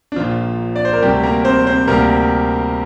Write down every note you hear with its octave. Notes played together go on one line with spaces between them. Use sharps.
D4
A#1 A#2 F3 F4
D5
C5
A#4
D2 C3 G3 G4
A#3 A#4
C4 C5
C4 C5
D2 C3 G3 A#3 A#4